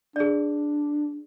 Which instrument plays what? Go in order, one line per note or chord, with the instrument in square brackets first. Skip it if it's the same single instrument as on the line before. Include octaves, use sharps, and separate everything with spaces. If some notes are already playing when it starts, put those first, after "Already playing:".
[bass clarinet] D4 [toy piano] G#4 D5